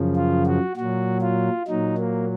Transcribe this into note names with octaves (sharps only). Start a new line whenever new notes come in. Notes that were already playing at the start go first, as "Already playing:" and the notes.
Already playing: F#2 C#3 F3
F4
F#4
A#2 F#3 F#4
F4
A#2 F#3 D#4
A#3